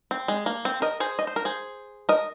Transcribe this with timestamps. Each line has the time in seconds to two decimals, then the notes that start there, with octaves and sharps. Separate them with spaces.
0.11 C4
0.28 G#3
0.46 A#3
0.65 C4
0.82 A#4 D#5
1.00 G#4 C5
1.19 D#5
1.27 C5
1.36 A#4
1.45 G#4 C5
2.09 A#4 D#5